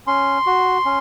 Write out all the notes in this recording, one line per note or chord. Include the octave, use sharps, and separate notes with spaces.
C#4 C6
F#4
C#4